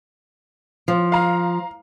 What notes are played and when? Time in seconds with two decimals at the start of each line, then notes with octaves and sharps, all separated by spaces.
0.88 F3
1.12 F5 A#5